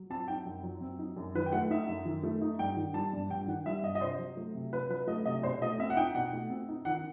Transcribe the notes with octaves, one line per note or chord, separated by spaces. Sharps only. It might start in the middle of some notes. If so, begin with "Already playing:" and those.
Already playing: F#3
C4 A5
D#4 G5
F#2
F#3
C4
D#4
F#2
D#3 B4
G5
A3 F#5
D#4 E5
F#2
D#3
A3
D#4
G2 G5
D#3
G3 A5
G2
G2 G5
D#3 F#5
G3 E5
G2 D#5
D#5
C3 C5
F#3
A3
C3
C3 B4
F#3 B4
A3 D#5
C3 D#5
B2 C5
A3 D#5
C4 E5
F#5
D#4 G5
B2 F#5
A3
C4
D#4
D#3 F#5